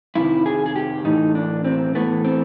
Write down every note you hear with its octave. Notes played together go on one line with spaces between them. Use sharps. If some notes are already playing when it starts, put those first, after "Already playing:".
F2 C3 D#3 E4
G#4
G#4
G4
A2 E3 A3 D#4
D4
C4
A2 E3 A3 B3
C4